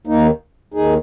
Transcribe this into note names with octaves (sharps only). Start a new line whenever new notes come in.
D#2 D#3 A#3 D#4
D#2 D#3 D#4 G#4